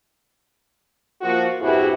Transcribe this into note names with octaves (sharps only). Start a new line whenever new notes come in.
F3 A#3 F4 F#4
E2 G2 C3 E4 F#4 G#4